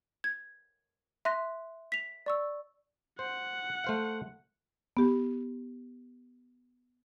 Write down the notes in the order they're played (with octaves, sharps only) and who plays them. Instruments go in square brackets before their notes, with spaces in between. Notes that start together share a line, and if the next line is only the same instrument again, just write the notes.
[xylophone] G#6
E5 C6 F#6 A#6
B6 F7
D5 C#6 E6
[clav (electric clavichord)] C5 [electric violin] F#5
[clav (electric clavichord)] A3 C5 F5
[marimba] B3 G4